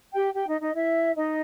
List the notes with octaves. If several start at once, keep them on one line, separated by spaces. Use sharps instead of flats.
G4 G5
G4 G5
D#4 D#5
D#4 D#5
E4 E5
D#4 D#5